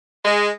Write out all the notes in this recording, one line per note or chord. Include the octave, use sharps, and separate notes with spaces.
G#3